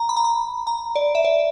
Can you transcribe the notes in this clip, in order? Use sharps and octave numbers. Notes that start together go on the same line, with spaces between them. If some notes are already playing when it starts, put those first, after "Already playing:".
Already playing: A#5
B5
A#5
B5
A#5
D5
E5
D5